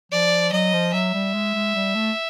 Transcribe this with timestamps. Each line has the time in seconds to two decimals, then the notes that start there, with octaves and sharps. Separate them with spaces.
0.12 F3 D5
0.52 F#3 D#5
0.73 F3
0.93 F#3 E5
1.14 G3
1.34 G#3
1.54 G#3
1.75 G3
1.95 A3